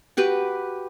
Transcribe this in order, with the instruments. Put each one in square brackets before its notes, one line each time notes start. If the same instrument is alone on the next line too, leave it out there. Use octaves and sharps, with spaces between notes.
[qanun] F#4 G4 B4